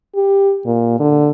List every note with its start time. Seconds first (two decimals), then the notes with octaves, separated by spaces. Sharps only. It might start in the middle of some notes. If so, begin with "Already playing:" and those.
0.16 G4
0.66 A#2
1.00 D3